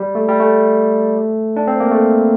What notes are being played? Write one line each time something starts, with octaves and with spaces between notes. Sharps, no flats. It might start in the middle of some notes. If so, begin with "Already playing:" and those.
Already playing: G3
A3
G3
A3
D4
C4
A#3
A3